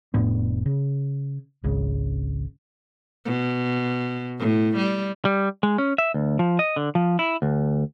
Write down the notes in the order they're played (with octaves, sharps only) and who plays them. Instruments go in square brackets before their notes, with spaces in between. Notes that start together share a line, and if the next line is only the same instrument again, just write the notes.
[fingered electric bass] F1 A2 B3 D4
C#3
G#1 C#2 C#3
[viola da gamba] B2
A2
G3
[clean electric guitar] G3
G#3
C#4
E5
D2
F3
D#5
D3
F3
E4
D2